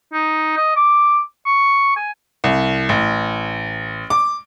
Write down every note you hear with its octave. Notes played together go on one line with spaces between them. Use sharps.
D#4
D#5
D6
C#6
G#5
C2
A1
D6